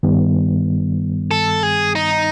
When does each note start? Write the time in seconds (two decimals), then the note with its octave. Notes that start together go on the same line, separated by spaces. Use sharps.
0.03 G2 D#3 G3 B3
1.31 A4
1.63 G#4
1.95 D#4